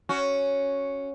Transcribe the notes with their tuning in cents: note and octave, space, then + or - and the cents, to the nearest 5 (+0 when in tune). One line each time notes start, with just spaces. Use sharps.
C#4 +0 F#4 +0